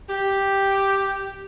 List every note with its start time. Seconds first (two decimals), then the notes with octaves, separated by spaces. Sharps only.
0.09 G4